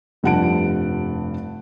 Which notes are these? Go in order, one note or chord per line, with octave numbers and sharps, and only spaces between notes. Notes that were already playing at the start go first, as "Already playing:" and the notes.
F1 G2 F3 F#5 A5 D7